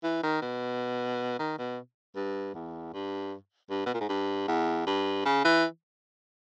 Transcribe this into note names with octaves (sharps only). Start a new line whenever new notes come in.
E3
D#3
B2
D#3
B2
G2
E2
G2
G2
B2
A#2
G#2
G2
E2
G2
C#3
E3